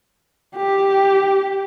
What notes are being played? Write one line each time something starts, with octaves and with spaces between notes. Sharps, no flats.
G4